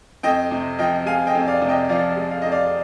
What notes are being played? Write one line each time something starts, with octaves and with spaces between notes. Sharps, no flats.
F2 D#5 G5
C3
F3 D#5 G5
G#3 F5 G#5
D#5 G5
F2
D5 F5
C3
D#5 G5
F3 D5 F5
G#3
F5
F2 D#5
D5 F5